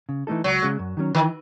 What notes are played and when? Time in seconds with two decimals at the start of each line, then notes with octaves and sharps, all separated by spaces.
0.09 C#3
0.27 E3 A3 D#4 A4
0.44 C#2 F#3
0.63 C#3 G#3
0.79 F#2
0.97 D#3 F#3 C#4
1.15 D#3 E3